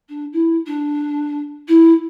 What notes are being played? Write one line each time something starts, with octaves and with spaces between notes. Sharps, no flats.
D4
E4
D4
E4